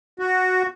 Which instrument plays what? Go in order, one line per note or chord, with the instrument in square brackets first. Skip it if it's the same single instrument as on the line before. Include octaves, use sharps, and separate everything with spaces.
[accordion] F#4